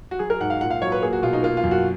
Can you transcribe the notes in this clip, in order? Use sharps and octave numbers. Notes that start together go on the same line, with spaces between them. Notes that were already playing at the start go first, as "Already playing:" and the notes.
F#4
F#3 G#4
A#4
G#2 F#5
F5
A#2 F#5
F5
F#3 C#5
B4
A#3 G#4
F#4
B2 F4
D#4
A#3 F4
F4
F#2
F#4